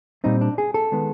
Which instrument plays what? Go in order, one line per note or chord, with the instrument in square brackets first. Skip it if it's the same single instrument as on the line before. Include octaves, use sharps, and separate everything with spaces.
[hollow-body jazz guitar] A#2 G3 C4 D#4
D4
G#4
A4
D#3 G#3 B3